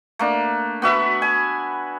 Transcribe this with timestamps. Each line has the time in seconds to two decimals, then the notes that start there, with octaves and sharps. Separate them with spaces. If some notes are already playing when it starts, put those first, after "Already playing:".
0.19 A3 A#3 D4
0.82 B3 F#4 E5 B5
1.22 G#5